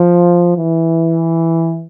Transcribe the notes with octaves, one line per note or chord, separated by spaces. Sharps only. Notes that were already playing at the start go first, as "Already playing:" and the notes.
Already playing: F3
E3